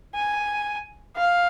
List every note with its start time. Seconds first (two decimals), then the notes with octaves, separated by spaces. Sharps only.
0.15 G#5
1.16 F5